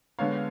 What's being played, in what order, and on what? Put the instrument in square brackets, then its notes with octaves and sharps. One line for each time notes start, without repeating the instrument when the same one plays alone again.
[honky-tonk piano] D3 G#3 B3 C#5 F5